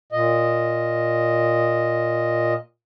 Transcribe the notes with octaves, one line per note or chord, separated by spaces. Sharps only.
A#2 D#5